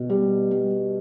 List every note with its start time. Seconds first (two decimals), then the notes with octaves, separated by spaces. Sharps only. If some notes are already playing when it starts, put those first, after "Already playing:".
Already playing: B2
0.10 G3
0.51 G3